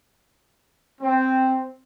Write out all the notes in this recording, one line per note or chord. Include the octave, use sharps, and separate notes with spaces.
C4